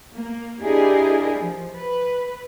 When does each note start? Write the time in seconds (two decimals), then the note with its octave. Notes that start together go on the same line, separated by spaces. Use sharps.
0.13 A#3
0.62 D4 E4 G4 G#4 A#4 D#5
1.39 F3
1.76 B4